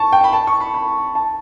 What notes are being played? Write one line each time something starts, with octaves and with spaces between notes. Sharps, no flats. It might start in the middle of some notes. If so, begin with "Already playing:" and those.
Already playing: A5 C#6
G5
B5
A5
C#6
B5
B5
A5